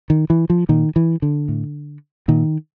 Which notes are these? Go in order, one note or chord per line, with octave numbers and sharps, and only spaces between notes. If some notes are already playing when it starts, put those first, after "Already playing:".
D#3
E3
F3
A#2 D#3
E3
D3
A2
A#2 D#3